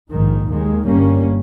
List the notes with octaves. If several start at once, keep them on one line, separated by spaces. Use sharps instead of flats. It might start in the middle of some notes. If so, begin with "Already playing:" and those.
A#1 G#2 D#3
D#2 D#3 G#3
G1 G2 G3 A#3 C#4